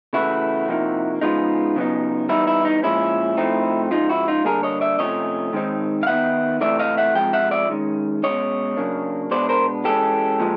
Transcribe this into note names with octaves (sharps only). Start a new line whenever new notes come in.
C#3 E3 A3 E4 F#4
C3 F3 A#3 D#4
C#3 F3 G#3 B3 D#4 F4
C#3 F#3 B3 D#4
E3 G3 B3 D#4 E4
E4
D#4
A#2 F3 G#3 C#4 E4
A2 F3 A3 C4 D#4
C#3 F3 G#3 D#4 F4
E4 F#4
D#4 F4
D3 G3 A#3 D4 G#4 A#4
C#5 D#5
D5 E5
C3 F3 A3 C#4 C#5 D#5
D#3 G#3 C4 D#4
F5
D#3 F#3 B3 D#4 E5 F#5
C3 E3 A3 D5 E5
D#5 F5
E5 F#5
C3 F3 G#3 G5
E5 F#5
D5 E5
D#3 G#3 C#4
B2 G#3 C#4 C#5 D#5
C#3 F#3 A#3 D4
B2 G#3 B3 D4 C5 D5
A#4 C5
E3 G#3 C#4 G4 A4
A#2 F3 G#3